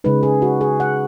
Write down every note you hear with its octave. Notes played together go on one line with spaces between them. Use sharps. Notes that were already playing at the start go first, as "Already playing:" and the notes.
C#3 G#3 D#4 B4
G#4
F#4
G#4
F#5